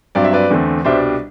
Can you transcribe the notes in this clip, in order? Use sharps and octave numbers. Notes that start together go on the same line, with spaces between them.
G2 F#3 C4 D5
E5
B4 D5
E2 D3 A3 C4
C2 B2 G3 D4 C5 E5